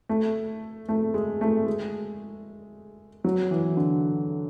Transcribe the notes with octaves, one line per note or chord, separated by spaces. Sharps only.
A3
A3
G#3
A3
G#3
F#3
E3
D3